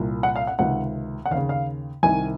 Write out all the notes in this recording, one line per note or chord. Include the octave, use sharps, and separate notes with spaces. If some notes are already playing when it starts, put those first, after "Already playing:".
Already playing: C2 A#2
F#5
F5
F#5
C#2 C3 D#3 F#5
F#5
D#2 C#3 F5
F5
C2 C3 D#3 G#5